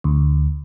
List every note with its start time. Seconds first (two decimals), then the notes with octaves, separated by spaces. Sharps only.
0.04 D2